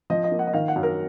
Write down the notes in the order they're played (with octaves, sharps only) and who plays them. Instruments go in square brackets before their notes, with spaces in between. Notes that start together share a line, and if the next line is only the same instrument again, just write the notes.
[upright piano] F3 D#5
D#5
A#3
F#5
D#5
D#3 F5
F#5
F#2
A#4